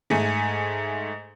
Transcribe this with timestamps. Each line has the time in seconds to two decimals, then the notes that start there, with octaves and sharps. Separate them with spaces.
0.10 G#2 A3 G#5